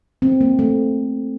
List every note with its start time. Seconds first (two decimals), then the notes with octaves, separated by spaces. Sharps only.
0.22 C4
0.41 A#3
0.59 A3